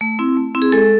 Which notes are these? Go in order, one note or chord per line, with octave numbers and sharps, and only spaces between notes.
A3
C4 E4
A3
C4 E4
G#4
G#3 A4